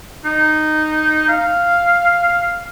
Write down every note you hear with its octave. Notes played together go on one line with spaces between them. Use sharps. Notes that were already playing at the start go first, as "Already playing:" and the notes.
D#4
F5